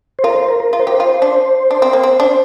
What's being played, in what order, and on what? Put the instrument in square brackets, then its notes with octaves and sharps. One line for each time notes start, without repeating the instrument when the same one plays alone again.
[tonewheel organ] C5
[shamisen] F4 [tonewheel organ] A#4
[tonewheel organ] C5
A#4
A#4
[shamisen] F4
[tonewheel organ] C5
[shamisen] G4 [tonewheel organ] A#4
[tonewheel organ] C5
[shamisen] F4
D4
D4
C4
A#3
C4
D4